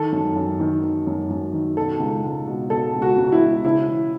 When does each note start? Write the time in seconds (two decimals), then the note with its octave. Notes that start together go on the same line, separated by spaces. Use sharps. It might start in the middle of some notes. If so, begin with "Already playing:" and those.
Already playing: D#3 A4
0.12 F#2
0.36 F#2
0.60 D#3
0.83 D#3
1.07 F#2
1.30 F#2
1.54 D#3
1.77 B2 A4
2.00 C#2
2.23 C#2
2.47 B2
2.70 B2 A4
2.94 C#2
3.02 F#4
3.17 C#2
3.27 F#4
3.32 E4
3.41 B2
3.65 C#3 E4
3.88 E3